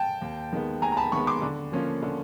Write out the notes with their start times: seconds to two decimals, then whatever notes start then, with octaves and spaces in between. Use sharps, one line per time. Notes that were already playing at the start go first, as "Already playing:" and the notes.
Already playing: G5 A5
0.22 D#2
0.53 D#3 G#3 B3
0.82 D#2 G#5 A#5
0.92 A#5
0.97 A5 B5
1.12 D#3 G#3 B3 B5 C#6
1.27 C6 D6
1.42 D3
1.72 F3 A#3 C#4 F4
2.02 D3